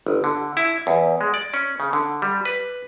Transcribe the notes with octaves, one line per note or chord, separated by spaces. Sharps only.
G1
D3
E4
E2
G#3
D5
C#4
C#3
D3
G3
B4